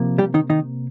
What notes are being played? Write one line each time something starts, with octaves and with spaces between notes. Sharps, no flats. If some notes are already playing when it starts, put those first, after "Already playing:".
Already playing: C3 F3 A#3
G3 G4
D#3 D#4
D#3 D#4